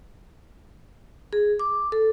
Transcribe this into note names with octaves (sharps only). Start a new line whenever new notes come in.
G#4
D6
A4